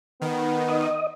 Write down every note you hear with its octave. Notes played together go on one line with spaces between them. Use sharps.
D#3 B3
D#5